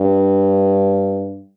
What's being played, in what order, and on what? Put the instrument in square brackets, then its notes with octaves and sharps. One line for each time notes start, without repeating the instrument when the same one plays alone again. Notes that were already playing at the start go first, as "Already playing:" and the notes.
Already playing: [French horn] G2